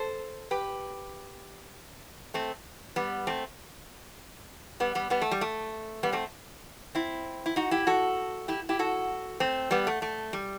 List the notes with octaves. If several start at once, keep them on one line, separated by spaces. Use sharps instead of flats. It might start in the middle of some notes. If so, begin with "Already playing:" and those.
Already playing: A4 C5
G4 B4
A3 C4
G3 B3
A3 C4
G3 B3
G3 B3
G3 B3
A3
G3
A3
G3 B3
A3 C4
C4 E4
E4
D#4 F#4
E4 G4
F#4 A4
E4 G4
E4 G4
F#4 A4
A3 C4
G3 B3
A3
A3
G3